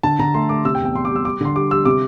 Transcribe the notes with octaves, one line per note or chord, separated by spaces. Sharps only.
D3 A5
D3 A#5
A3 C6
A3 D6
C3 E6
G5
E2
G5
E2 C6
D6
G3
E6
G3 D6
D3 C6
G3 D6
G3 E6
C3 D6